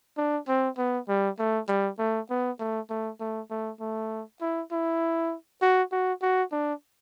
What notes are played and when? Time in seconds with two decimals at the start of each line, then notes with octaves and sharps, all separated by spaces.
0.17 D4
0.48 C4
0.78 B3
1.08 G3
1.39 A3
1.68 G3
1.99 A3
2.30 B3
2.59 A3
2.90 A3
3.20 A3
3.50 A3
3.80 A3
4.41 E4
4.71 E4
5.62 F#4
5.92 F#4
6.22 F#4
6.52 D4